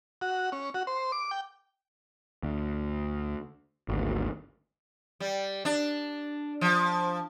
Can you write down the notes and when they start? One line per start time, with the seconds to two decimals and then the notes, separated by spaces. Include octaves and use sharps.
0.21 F#4
0.52 C#4
0.74 F#4
0.87 C5
1.12 D6
1.31 G5
2.43 D2
3.88 G#1 D2
5.20 G3
5.65 D4
6.61 F3